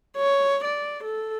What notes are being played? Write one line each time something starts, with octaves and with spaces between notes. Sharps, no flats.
C#5
D5
A4